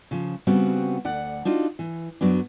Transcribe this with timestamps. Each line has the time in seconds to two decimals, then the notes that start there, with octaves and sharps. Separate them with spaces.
0.11 C#3 F3
0.47 C#3 G3 B3 C4 F#4
1.05 D2 D5 F#5
1.45 D4 D#4 F4 F#4
1.79 E3
2.21 F#2 F#3 B3 D4